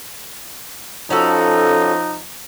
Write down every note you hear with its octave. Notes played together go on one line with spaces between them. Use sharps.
F3 C#4 D#4 F#4 A4